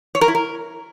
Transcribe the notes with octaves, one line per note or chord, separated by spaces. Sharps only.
C#5
A#4
E4
A#4